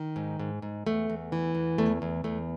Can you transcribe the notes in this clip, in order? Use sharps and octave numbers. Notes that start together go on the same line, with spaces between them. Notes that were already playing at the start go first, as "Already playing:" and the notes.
Already playing: D#3
G#2
G#2
G#2
E2 A3
E2
E3
E2
E2 A3
E2
E2 A3